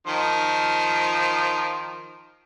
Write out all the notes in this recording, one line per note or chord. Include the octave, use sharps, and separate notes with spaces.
D#3 F3 C6